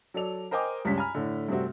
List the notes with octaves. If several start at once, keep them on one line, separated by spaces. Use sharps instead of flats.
F#3 A4 D5 F7
A#4 C5 D#5 G5 G#5 D6
C#2 G2 C#4 B6
G#5 A#5 B5 F6
A2 D3
G2 C3 A3 C4 F#4